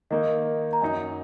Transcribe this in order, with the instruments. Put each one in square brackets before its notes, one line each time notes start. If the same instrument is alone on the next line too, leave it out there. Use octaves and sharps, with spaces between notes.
[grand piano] D#3 A#3 D#4 [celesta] A#4 D#5
[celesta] A#5
[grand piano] F#2 F#3 D#4 [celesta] D#5 G#5